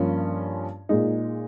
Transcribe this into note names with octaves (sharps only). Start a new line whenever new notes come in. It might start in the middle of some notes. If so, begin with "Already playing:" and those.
Already playing: G2 F3 A#3 C#4 F4
A#2 G#3 D#4